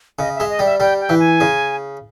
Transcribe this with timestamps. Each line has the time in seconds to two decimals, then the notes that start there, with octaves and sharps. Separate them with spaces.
0.19 C#3 D#5
0.35 E5
0.40 G#3
0.50 D#5
0.59 G3
0.65 E5
0.80 G3 G5
1.01 G5
1.09 E3
1.19 G#5
1.41 C#3